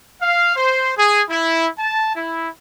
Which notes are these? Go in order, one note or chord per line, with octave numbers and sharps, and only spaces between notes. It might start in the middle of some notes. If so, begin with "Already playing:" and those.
F5
C5
G#4
E4
A5
E4